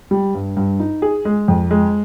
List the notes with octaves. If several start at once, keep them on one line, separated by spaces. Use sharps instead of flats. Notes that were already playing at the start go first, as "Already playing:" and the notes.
G3
G2
G2
D#4
G#4
G#3
F2
G#3